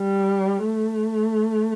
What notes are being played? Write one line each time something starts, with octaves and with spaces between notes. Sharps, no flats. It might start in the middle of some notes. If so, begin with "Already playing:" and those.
Already playing: G3
A3